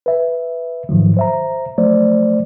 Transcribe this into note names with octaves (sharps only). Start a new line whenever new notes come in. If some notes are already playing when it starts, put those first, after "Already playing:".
B4 E5
G#2 D#3 F3 F#3
C5 E5 A#5
F3 F#3 A3 C5 D5